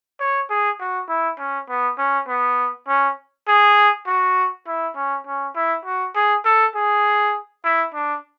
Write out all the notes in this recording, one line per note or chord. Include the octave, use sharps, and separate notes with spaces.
C#5
G#4
F#4
E4
C#4
B3
C#4
B3
C#4
G#4
F#4
E4
C#4
C#4
E4
F#4
G#4
A4
G#4
E4
D4